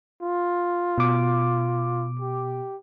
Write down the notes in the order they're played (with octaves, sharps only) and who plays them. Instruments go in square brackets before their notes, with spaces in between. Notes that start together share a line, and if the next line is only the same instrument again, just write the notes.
[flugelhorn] F4
[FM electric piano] B2 D6
[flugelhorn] G4